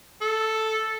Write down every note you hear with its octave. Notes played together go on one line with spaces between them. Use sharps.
A4